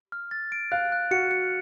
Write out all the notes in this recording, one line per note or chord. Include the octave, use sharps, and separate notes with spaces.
F6
A6
D7
F5 F#6
F#6
F#4 C#7
C#7